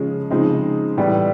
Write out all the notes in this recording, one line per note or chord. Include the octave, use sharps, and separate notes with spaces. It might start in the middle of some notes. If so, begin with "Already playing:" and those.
Already playing: C#3 F3 G#3 C#4 F4
C#3 F3 G#3 C4 D#4
A2 E3 G3 B3